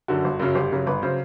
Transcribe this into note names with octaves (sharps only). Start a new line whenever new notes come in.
F#2 D3 F#4
G1
F#2 C#3 F#3
G1 G4
F#2 C#3 F#3
G1 B4
C#3 F#3 C5